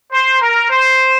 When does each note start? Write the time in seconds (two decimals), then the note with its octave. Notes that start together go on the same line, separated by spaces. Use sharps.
0.11 C5
0.40 A#4
0.70 C5